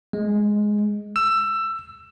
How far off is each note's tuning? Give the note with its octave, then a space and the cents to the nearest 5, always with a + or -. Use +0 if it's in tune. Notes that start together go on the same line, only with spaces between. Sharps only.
G#3 +5
E6 +20